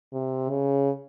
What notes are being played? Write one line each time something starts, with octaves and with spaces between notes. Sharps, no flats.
C3
C#3